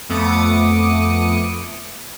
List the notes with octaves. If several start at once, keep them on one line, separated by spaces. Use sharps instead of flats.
F2 A3 B3 D6 D#6 C#7